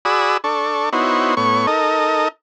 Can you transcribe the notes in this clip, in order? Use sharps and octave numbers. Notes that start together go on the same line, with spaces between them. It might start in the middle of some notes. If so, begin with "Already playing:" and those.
F#4 G#4 D5 B5 D#6 E6
D4 A4 C#6
B3 D#4 E4 F#4 C5 C#5
A2 B3 C#5 C#6
D#4 A4 A#4 D#5